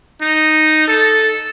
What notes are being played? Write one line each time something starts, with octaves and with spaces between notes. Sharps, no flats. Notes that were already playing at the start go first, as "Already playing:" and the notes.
D#4
A4